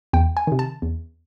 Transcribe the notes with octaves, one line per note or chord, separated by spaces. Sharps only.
E2 G5
G#5
C3 D#3
A5
E2